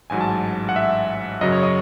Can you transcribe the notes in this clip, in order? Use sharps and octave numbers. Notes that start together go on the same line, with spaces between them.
A1 G#2 F#3 G#5
A5
F#5
E5
F#2 C#3 F#3 D#5
C#5
D#5